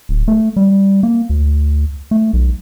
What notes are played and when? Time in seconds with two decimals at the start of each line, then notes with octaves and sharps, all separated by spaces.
0.09 D1
0.28 A3
0.56 G3
1.03 A#3
1.29 D2
2.11 A3
2.33 B1